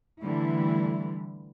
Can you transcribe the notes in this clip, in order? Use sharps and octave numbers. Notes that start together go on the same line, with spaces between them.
D3 E3 G3 A3 E4